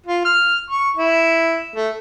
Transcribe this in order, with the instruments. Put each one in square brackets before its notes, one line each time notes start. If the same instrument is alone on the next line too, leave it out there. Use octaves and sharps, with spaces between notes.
[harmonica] F4
F6
C#6
E4
A3